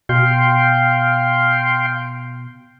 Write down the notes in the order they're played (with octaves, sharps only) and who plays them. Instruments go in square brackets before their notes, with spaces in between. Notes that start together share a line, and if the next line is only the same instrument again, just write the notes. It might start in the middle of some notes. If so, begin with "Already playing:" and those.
[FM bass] B2 [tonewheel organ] F5 G5 C6